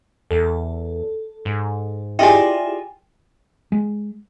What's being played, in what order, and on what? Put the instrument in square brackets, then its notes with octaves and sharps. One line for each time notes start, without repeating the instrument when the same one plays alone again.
[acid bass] E2 [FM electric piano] A4
[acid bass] G#2
[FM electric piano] E4 G4 G#4 [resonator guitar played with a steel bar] F4 D5 D#5 [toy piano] G5 G#5
[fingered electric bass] G#3